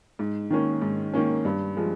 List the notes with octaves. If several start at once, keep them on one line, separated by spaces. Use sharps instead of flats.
G#2
D#3 A#3 C#4
G#2
D#3 A#3 C#4
G2
F3 G#3